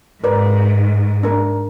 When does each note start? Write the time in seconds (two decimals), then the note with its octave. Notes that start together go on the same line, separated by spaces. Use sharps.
0.24 G#2 A#4 B4 D5
1.23 D4 A#4